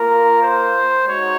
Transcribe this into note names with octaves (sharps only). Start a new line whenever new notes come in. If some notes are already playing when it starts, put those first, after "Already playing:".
Already playing: A#3 F4 A#4
C5
G#3 D#4 F#4 C#5